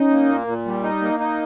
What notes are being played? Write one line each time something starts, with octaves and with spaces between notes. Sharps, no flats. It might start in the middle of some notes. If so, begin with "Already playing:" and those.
Already playing: C#4 D#4
A#3
A#2
A#2
G3
D#4
A#3
D#4